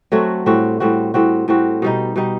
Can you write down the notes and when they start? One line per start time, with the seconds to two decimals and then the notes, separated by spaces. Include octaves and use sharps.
0.12 F#3 A3 C4 F#4
0.46 A2 G3 C4 F#4
0.80 A2 G3 C4 F#4
1.14 A2 G3 C4 F#4
1.48 A2 G3 C4 F#4
1.82 B2 G3 D#4
2.16 B2 G3 D#4